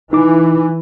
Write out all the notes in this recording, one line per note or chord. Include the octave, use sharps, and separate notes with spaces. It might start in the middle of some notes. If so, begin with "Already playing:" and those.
E3 D#4 D6